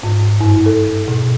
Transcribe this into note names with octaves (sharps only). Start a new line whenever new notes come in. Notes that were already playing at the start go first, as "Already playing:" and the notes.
G#2
G2
A4
B2